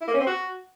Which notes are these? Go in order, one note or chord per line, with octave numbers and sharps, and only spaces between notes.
E4
A#3
C#4
C4
F#4